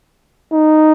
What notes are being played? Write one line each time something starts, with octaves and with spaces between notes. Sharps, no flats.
D#4